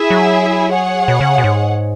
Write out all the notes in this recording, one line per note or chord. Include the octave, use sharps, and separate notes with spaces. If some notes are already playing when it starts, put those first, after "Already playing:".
Already playing: E4 G#4 E5
F#3
G#4 C#5 F#5
B2
C#3
B2
G#2